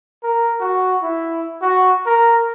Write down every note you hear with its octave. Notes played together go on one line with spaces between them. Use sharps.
A#4
F#4
E4
F#4
A#4